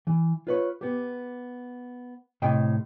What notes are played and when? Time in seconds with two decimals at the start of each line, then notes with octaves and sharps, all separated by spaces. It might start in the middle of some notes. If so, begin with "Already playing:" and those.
0.07 E3
0.47 F4 B4 C#5
0.81 B3 G4
2.42 A2 C3 D#5 G5